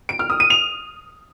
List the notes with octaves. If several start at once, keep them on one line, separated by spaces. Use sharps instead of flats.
D7
F6
D#6
D#7
F7